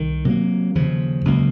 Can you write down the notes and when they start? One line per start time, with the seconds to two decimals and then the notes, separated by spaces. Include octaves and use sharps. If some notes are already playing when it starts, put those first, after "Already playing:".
Already playing: C2 D#3
0.25 C3 F#3 A#3
0.75 D#2 C#3 F3
1.25 C#2 C#3 F#3 A#3